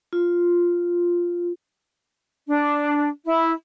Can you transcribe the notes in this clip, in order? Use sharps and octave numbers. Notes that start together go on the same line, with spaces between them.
F4
D4
E4